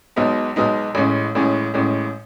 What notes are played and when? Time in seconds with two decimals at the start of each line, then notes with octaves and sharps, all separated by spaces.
0.16 B1 B2 G#3 B3 D#4
0.56 B1 B2 G#3 B3 D#4
0.95 A1 A2 G#3 C#4
1.35 A1 A2 G#3 C#4
1.74 A1 A2 G#3 C#4